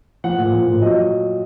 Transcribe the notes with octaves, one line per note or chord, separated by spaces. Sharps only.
F3 F#5
A#2
F3
A#2
F#3 D#5